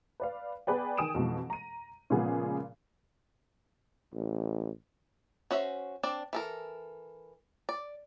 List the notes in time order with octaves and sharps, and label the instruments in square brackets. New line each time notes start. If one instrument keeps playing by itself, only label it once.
[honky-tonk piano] B4 D5 F5
B3 G#4 B4 D5 G5
D#3 G5 G#5 D#6 D7 E7
F2 B2 E3 G#3
A#5 D#7
A#2 C#3 F3 G#3 B3 G#4
[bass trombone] A1
[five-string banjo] C#4 F#4 C5 E5
C4 D4 D5
E3 A4 A#4
D5